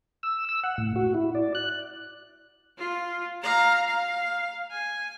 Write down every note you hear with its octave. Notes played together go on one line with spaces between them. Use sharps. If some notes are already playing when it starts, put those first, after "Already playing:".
E6
E6
F#5
A2
F#4
E4
D5
F#6
F4
F5 A#5
F5
G#5